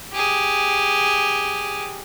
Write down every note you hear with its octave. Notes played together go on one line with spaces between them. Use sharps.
G4 G#4